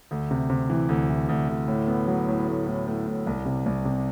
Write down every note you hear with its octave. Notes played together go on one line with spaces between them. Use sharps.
D2
C3
C3
E3
D2
E3
D2
D2
A2
B3
F#3
A2
A2
A2
A2
A2
C2
C3
C2
C3